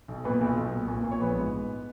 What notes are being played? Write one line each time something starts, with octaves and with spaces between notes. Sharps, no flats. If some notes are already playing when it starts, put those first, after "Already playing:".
B1
A#2 B3 B4
B1
B1
A#2
A#2
A#2
C#5
A#1 B3 B4
G#2
G#2